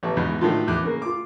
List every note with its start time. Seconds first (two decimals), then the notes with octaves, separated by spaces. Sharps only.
0.03 A1 B3 A5
0.17 E2 G#2 B2
0.41 A2 D#3 F#3 D4 F4
0.68 E2 D6 F#6
0.83 C#3 A#3
1.02 F4 D6